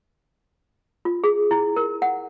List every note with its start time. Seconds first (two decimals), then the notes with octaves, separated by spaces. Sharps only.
1.05 F4
1.24 G#4
1.51 E4
1.76 A#4
2.02 F#5